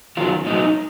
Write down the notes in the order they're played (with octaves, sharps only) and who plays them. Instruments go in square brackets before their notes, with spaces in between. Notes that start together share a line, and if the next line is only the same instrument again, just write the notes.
[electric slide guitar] F#2 D#3 F#3 F4
A2 F#3 D#4